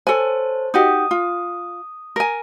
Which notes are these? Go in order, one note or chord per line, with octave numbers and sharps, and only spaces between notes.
A4 C5 C#5 G#5 A5
D#4 F#4 G4 D#6
F4
A#4 G#5